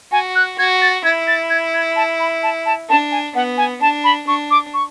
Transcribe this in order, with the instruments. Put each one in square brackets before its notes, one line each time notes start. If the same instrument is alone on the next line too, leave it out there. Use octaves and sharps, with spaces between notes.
[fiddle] F#4 [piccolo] G#5
[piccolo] F#6
[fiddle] F#4 [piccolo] G#6
[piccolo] A6
[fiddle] E4 [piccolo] G#6
[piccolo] A6
G#6
G#6
A5
B5
A5
A5
[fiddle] D4 [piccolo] A5
[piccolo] G#5
[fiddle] B3 [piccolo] F#5
[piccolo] G#5
[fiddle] D4 [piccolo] A5
[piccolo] B5
[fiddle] D4 [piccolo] C#6
[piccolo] D6
C#6